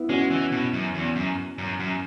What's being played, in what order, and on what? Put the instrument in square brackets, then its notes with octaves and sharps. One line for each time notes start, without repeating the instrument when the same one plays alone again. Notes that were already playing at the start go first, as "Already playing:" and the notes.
Already playing: [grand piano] B3 E4
[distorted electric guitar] G#3 [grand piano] C#4 F#4
[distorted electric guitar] E3
B2
F#2
E2
F#2
F#2
F#2